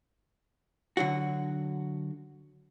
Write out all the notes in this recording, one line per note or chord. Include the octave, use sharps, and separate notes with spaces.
D3 F#3 F#4